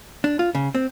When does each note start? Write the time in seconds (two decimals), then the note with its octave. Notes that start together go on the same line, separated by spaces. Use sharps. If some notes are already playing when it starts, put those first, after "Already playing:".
0.24 D4
0.39 F4
0.55 C#3
0.75 C4